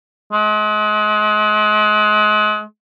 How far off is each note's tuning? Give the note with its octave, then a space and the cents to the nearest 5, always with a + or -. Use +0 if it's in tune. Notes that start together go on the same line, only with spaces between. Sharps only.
G#3 +35